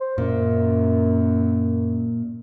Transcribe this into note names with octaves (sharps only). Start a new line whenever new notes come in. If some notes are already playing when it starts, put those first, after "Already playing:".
C5
F#2 A#2